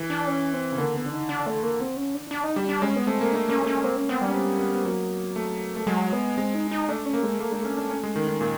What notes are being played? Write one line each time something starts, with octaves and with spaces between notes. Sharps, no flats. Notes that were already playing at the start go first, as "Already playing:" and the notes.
Already playing: E3
D4
C#4
C4
C#3
D3 A#3
B3
D4
D#4
D4
A3
A#3
C4
C#4
D4
D4
D#4
G3 D4
D4
G#3 C#4
B3
A3 C4
A#3
A3 D4
A#3 C#4
A3
C#4
A#3 C4
C#4
B3 C4
G3 C#4
C4
B3
B3
F#3 A#3
A3
A3
F#3 G#3
B3
G#3 C4
D#4
D#4
A3 D4
C#4
A#3
G#3
A3 A#3
G#3 D4
A3 C#4
D4
C#4
G#3
D#3
D#3
A#2 A#3